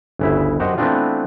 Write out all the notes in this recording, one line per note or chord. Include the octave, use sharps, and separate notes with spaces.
G1 D2 C#3 E4 E5
F#2 F#4 G4 C5 D#5
E3 A3 B3 C4 D4 F4